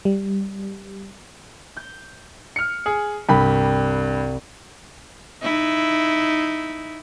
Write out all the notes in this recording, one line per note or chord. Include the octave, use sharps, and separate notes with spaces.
G3
G6
F6 C#7
G#4
C2 G2 G5 B5 B6
D#4 E4